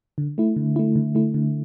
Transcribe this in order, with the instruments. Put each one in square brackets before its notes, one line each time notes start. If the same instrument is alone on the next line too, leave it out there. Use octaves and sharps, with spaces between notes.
[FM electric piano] D3
A3 E4
D3
A3 E4
D3
A3 E4
D3